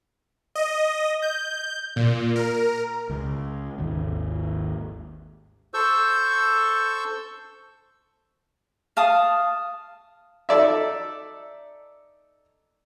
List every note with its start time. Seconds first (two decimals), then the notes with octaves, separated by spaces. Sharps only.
0.55 D#5
1.22 G6
1.96 A#2
2.36 A#4
3.10 C#2
3.78 G#1 D#2
5.74 A4 C5 C#6 E6 G6
8.97 F5 A5 D#6
10.49 D#4 A4 D5 E5